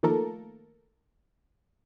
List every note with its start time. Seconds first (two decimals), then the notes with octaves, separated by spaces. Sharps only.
0.03 D#3 F3 A3 A#3 A4 A#4